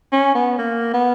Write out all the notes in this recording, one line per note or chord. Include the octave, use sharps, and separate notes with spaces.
C#4
B3
A#3
B3